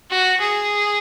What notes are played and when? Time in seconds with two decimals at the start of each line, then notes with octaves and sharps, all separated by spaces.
0.10 F#4
0.41 G#4